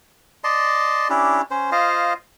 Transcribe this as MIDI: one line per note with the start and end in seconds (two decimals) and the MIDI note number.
0.44 1.08 74
0.44 1.08 75
0.44 1.08 81
0.44 1.08 84
1.10 1.41 61
1.10 1.41 62
1.10 1.41 64
1.10 1.41 67
1.51 1.71 61
1.51 1.71 72
1.72 2.13 65
1.72 2.13 72
1.72 2.13 75
1.72 2.13 77